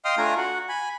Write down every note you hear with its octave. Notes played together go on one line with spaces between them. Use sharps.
D#5 F5 G5 C6 D#6 F6
A3 D4 F4 G#5 A#5
F#4 F#5
G#5 B5